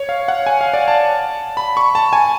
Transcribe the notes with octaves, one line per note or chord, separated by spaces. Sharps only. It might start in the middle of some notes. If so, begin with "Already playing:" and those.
Already playing: C#5
F5
F#5
G#5
F5
D5
A5
B5
C#6
A5
G#5